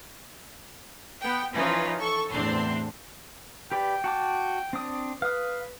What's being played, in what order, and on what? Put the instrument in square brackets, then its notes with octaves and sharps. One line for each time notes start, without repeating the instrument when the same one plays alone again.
[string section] B3 G5
E3 F3 C#4 D#4 F4 B4
A4 C#6
E2 A2 C4 D4 C6
[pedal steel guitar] G4 B4 D5 [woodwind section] G5
[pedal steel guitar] F#4 A5 D6
C4 D4 D#6
[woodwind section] B4 [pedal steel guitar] F5 D#6